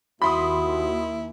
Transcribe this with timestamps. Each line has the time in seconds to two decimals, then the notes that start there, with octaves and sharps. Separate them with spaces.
0.22 D#2 E4 F#4 B5 C6 D#6